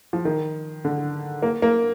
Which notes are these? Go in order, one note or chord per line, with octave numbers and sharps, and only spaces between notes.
F3
D#3
D3
A#3
A#3